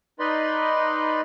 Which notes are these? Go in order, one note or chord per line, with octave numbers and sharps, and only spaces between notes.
D#4 B4 D5 D#5 B5 C6